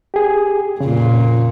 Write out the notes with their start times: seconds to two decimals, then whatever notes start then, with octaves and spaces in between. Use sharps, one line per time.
0.14 G4 G#4
0.80 F2 A#2 C#3